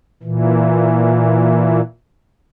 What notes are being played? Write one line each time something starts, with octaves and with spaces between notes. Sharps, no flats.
A#2 E3